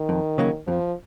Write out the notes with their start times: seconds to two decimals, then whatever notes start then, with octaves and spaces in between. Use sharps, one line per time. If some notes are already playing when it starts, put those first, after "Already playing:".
Already playing: D#3
0.09 F2
0.38 C#3 F#3 A#3 C#4
0.67 F2 F3